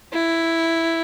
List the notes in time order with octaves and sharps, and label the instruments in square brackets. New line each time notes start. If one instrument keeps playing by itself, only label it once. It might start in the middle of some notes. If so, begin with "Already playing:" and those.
[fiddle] E4